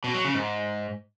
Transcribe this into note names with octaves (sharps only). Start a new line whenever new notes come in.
B2
F#3
C#3
G#2